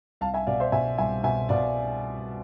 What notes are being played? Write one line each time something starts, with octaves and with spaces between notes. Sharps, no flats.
C2 F5 A5
E5 G#5
B2 D5 F5
C5 E5
B2 E5 G#5
C2 E5 G#5
B2 E5 G#5
B2 D5 F5